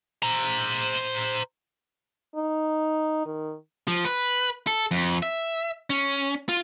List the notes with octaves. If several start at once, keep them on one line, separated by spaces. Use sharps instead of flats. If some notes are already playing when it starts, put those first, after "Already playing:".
C5 A#5
D#4
D#3
F3
B4
A4
F2
E5
C#4
F4